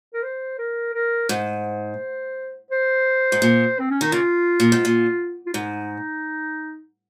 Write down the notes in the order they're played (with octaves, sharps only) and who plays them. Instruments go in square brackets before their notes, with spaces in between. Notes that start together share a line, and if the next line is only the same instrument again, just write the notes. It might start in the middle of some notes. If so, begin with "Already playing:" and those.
[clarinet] A#4
C5
A#4
A#4
[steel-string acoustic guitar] G#2 [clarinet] C5
[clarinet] C5
[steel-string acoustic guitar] G#2
A#2
[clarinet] C4
C#4
[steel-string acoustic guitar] D#3 [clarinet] D#4
[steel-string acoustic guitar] C#3 [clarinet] F4
[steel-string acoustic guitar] A#2
G#2
A#2
[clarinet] F4
[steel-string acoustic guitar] G#2 [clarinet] D#4